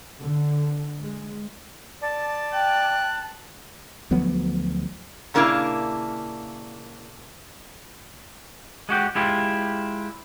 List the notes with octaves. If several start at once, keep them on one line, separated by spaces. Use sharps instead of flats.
D3
G#3
D5 A5
G5 F#6
D2 F3 F#3 B3
A#2 C#3 A#3 D4 E4 F5
G#3 F#4 G4
G#3 E4 F4 G4